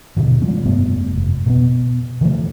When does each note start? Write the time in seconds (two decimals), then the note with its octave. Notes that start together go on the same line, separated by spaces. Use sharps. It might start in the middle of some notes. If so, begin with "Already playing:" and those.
0.17 D#1 B2 D3 D#3
0.42 F3 G3 G#3 C#4
0.64 F1 G2 A3 B3
1.16 F1
1.46 B2 A3 B3
2.21 D3 E3 F3 A3